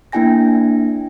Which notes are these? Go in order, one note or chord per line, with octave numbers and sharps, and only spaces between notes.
A#3 D4 E4 G5 G#5 A#6